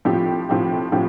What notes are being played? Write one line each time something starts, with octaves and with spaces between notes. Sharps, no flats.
A2 F3 C4 G4
A2 F3 C4 G4
A2 F3 C4 G4